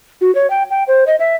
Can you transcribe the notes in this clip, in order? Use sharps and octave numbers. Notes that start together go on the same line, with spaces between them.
F#4
C#5
G5
G5
C5
D#5
E5